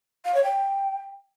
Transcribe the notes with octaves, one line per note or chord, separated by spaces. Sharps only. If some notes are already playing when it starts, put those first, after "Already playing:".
F5
C#5
G5